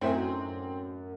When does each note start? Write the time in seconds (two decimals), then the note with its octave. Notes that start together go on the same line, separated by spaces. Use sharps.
0.01 F#2 A2 C4 C#4 D#4 E5 G#5